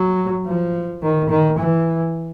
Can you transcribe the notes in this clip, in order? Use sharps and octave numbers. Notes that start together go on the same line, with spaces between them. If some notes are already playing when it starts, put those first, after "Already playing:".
Already playing: F#3
F3
D#3
D#3
E3